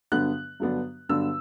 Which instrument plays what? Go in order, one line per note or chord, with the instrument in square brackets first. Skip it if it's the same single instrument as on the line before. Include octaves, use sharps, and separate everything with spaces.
[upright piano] G2 D3 F#3 B3 D4 F#6
G2 D3 F#3 B3 D4
G2 D3 F#3 B3 D4 E6